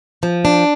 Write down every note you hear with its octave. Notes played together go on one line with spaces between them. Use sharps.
F3
D4